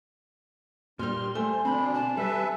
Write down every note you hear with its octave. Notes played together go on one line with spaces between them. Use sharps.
G2 A#2 G3 C6 F6
A3 C5 G#5
B2 D3 C4 D4 B5
A5
G3 A4 B4 E5